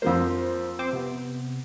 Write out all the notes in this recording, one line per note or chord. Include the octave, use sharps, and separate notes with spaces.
F2 F3 A#3 C5
C4 C5 D6
C3 B3